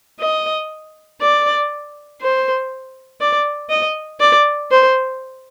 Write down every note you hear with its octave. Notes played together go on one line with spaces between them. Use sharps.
D#5
D5
C5
D5
D#5
D5
C5